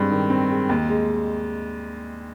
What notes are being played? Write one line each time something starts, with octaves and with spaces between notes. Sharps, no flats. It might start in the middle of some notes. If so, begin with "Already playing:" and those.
Already playing: G2 G#3 C4
D#3
C4
G#3
D#2
G#3